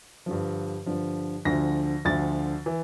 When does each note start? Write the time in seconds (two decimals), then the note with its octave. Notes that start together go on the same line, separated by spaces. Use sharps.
0.26 G2 D3 F3
0.86 G2 D3 F3
1.45 D2 D3 F3 A#6
2.05 D2 D3 F3 A6
2.66 E3